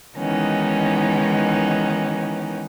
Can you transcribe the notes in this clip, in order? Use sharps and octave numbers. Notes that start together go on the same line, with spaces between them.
D#3 E3 G#3 B3 C#4 D#4